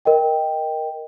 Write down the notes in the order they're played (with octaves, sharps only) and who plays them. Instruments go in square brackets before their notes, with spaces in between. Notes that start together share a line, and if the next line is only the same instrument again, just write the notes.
[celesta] A#4 D#5 G5